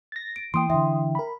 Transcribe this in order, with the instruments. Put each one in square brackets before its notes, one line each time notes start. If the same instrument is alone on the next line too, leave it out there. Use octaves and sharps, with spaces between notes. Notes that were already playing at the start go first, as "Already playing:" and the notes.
[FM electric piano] A6 A#6
[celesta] D7
[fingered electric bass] E3 A#3 [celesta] G5 D7 [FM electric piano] C6 D#6
[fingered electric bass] D3 E3 [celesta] E5 G5
[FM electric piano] A#4 B5